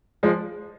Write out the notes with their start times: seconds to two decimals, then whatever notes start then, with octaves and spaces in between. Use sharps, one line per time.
0.23 F3 G#3